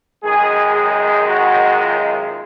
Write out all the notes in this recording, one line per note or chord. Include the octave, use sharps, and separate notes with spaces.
F#2 D#3 G#3 G#4
G#4
F#4
F4